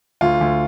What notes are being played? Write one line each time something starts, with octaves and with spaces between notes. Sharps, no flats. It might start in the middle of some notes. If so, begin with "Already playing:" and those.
D2 F4
D2